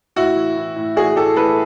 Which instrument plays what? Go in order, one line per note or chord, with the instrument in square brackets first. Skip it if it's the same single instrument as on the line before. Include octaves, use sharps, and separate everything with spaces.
[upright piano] A2 E4 F#4
E3
E3
A2
E3 F#4 G#4
A2 G4 A4
E3 A4 B4